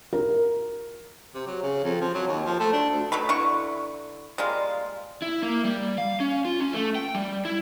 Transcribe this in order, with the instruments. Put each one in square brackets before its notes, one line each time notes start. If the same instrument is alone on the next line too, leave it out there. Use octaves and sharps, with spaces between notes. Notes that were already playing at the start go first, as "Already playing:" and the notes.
[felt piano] A#4
[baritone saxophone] C3
F#3
C#3
F2
F3
F#3
D#2
F3
A3
D4
D2
[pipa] B2 F#3 A3 B5
D3 E4 C#6
G3 G#3 A#3 F4
[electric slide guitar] E4
A#3
G3
F5
C#4
F4
C#4
A3
G5
G3
E4